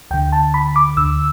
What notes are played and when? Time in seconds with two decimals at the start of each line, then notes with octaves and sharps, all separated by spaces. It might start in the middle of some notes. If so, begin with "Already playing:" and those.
0.11 D2 D3 G5
0.32 A5
0.54 B5
0.76 D6
0.97 D2 D3 E6